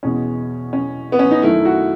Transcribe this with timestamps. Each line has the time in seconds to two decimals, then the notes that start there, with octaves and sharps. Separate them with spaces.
0.03 E2 B2 G#3 C#4
0.73 C#4
1.12 B3
1.19 C#4
1.31 D#4
1.42 F#2 D#3 A3 E4
1.65 F#4